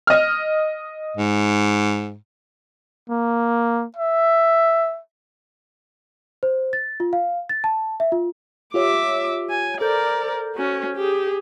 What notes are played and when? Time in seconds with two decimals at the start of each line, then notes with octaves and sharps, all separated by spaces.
0.07 D#5 F6
1.17 G#2
3.10 A#3
3.96 E5
6.43 C5
6.73 A6
7.00 F4
7.13 F5
7.49 A6
7.64 A5
8.00 E5
8.12 F4
8.74 F4 G4 C#5 E5 D6
9.50 G#5
9.81 A4 A#4 C5 D5 G6
10.55 C#4 F#4
10.96 G4 G#4